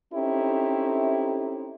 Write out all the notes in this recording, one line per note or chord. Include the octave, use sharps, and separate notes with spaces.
C4 C#4 D#4 E4 G4 A4